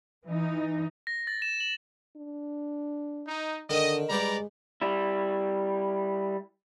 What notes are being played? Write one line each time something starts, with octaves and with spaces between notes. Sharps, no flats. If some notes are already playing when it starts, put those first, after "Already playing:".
E3 D#4
A#6
A6
E7
F#7
D4
D#4
D3 D#3 D#5
G3 G#3 B3 G4 D5 A#5
G3 E4